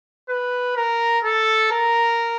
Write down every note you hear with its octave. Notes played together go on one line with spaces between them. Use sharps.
B4
A#4
A4
A#4